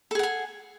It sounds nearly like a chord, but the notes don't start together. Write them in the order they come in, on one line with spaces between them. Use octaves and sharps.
A4 G#4 F#5 G#5